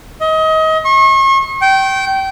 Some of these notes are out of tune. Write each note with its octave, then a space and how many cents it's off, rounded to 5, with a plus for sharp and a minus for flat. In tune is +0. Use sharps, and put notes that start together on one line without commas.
D#5 +30
C#6 -40
G5 -25